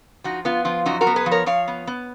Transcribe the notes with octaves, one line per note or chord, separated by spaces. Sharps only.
F3 D#4 F#4
B3 F4
F3 F4
F#2 D#4 F#4
F#4 A#4
B3
G#4 B4
F3
A#4 C#5
F3 C#5 F5
B3
B3